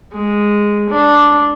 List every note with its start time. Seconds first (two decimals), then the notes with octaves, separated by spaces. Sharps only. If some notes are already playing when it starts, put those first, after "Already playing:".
0.14 G#3
0.90 D4